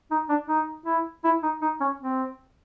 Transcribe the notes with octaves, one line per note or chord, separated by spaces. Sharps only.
D#4
D4
D#4
E4
E4
D#4
D#4
C#4
C4